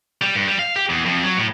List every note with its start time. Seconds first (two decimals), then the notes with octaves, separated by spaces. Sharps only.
0.22 G3
0.35 G2
0.47 G3
0.59 F5
0.76 G4
0.90 E2
1.06 F2
1.23 F#3
1.37 A2